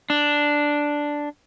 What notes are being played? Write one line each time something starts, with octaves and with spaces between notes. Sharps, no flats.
D4